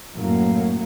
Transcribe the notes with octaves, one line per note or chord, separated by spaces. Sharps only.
F#2 A2 F#3 A#3